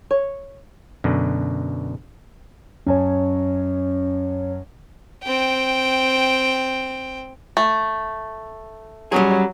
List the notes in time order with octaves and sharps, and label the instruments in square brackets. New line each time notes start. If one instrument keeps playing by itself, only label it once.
[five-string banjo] C#5
[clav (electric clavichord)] F#2 B2 D3
[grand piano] F#2 G#5 A5 [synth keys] C#4 C#5
[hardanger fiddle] C4 G5
[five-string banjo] A3
[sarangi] F#3 [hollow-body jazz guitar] G3 C#4 G#4